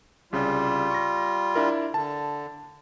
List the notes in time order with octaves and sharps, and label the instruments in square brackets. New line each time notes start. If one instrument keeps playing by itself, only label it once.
[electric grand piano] C2 C#3 [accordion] G3 F4
[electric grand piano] C#6 A#6
D4 E4 A#4
[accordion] D3 [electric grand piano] A5